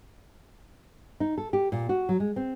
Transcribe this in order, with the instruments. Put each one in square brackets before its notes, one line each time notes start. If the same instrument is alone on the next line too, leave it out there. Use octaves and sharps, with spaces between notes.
[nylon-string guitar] D#4
A4
G4
A#2
F#4
F#3
G#3
C4